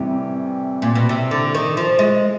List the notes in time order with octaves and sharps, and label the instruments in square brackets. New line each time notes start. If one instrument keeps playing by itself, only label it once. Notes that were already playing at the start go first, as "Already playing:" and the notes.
Already playing: [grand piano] A2 E3 G3 C4 [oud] C3
[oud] A#2
B2
C3
D3
D#3
F3
G#3